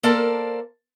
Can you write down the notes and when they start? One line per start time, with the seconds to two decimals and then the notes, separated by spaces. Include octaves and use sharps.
0.03 A#3 A4 A#4 C5 D5 A5